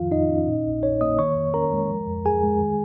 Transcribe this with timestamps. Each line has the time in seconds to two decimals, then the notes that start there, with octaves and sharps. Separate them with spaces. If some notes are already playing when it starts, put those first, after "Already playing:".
Already playing: F2 D#3 F3 F4 F5
0.11 F2 D#4 D#5
0.30 C#4
0.47 A#2
0.65 A#1
0.83 A#1 C#5
1.01 A#3 D#5 D#6
1.19 D#3 C#5 C#6
1.36 F2
1.54 C#4 A#4 A#5
1.72 G#3
1.90 F3
2.07 F2
2.26 F2 G#4 G#5
2.43 G#3
2.61 D#3